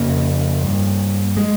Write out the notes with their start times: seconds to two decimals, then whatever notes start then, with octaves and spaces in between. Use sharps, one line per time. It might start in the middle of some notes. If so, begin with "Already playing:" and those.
Already playing: F2 C#3 A#3
0.64 G2
1.37 G#3